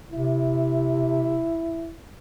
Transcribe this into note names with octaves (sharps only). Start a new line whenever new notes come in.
C3 E4